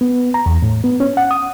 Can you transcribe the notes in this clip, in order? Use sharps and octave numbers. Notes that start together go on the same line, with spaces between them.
B3
A#5
E2
A2
B3
C#4
F#5
D#6